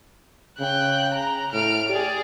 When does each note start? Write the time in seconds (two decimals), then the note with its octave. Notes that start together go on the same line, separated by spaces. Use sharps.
0.60 C#3 G5 F#6
1.15 A#5
1.53 A2 F6 D7
1.89 G4 G#4 D5